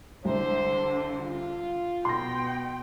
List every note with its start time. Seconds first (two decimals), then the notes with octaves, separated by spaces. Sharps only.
0.25 C2 D3 C5
1.20 F4
2.05 B2 G5 C6 A#6